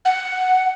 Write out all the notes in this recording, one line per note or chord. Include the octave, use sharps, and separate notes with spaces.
F#5